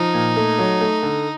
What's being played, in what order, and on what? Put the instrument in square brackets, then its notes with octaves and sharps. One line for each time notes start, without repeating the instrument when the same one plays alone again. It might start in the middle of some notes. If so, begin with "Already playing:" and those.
Already playing: [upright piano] F3 [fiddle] D#4
[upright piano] A#2
A3
F#3
A3
D3